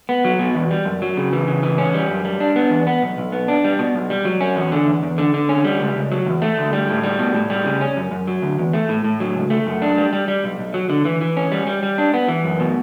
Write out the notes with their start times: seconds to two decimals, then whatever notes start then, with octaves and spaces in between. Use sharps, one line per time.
0.09 B3
0.25 F#3
0.39 B2
0.55 E2
0.71 G3
0.85 F#2
1.02 F#3
1.17 C#3
1.33 E3
1.48 C#3
1.63 E3
1.78 C#4
1.94 G3
2.10 F#2
2.25 G3
2.41 D4
2.56 B3
2.71 E2
2.87 B3
3.02 B1
3.18 B1
3.32 B3
3.48 D4
3.64 G3
3.79 B2
3.95 B1
4.10 G3
4.25 F#3
4.41 C#4
4.56 E2
4.72 D3
4.87 E2
5.03 E2
5.18 D3
5.34 D3
5.49 C#4
5.64 G3
5.81 C#2
5.96 C#2
6.12 F#3
6.26 E2
6.42 A3
6.58 D2
6.73 G3
6.89 A2
7.03 G3
7.19 B2
7.35 A2
7.50 G3
7.66 C#3
7.81 C#4
7.97 F#2
8.11 F#2
8.27 F#3
8.42 D2
8.59 E2
8.73 A3
8.89 A2
9.04 A2
9.20 F#3
9.35 C#2
9.50 A3
9.66 F#2
9.82 D4
9.97 G3
10.13 G3
10.28 G3
10.44 B1
10.59 B1
10.74 F#3
10.90 D3
11.05 E3
11.21 E3
11.37 C#4
11.52 G3
11.67 G3
11.83 G3
11.98 D4
12.14 B3
12.28 E3
12.44 F#2
12.60 B2